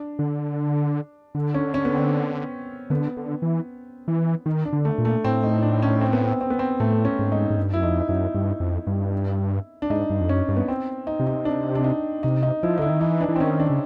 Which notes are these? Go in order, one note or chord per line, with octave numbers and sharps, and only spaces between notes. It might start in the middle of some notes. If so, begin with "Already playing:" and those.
Already playing: D4
D3
D3
C#4
C#4
B3
C4
D3 B3
D3
E3
E3
D#3
D4
D3
A3
A#2
A3
A2 C4
D#4
D4
C#4
C4
B3
C4
C4
B3
C4
A2 A3
C#4
G#2
D#4
G#2
G2
F#2 E4
F2 D#4
F#2 E4
G2
F2
G2
D4
G#2 D#4
G2
F2
F#2 C#4
G2
B3
C4
D#4
C3
D#4
D4
D4
D#4
C3 D#4
D#4
F3 E4
D3 D#4 E4
D#3
E3 D#4
D4
E3
C4
D#3 C#4
D4
C#3